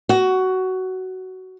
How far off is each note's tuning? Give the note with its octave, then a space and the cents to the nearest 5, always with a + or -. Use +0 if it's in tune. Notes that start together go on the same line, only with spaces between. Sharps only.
F#4 +15